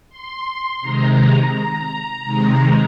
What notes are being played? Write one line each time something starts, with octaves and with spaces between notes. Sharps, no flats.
C6
C3 D#3 G#3 A#5
C3 D#3 G#3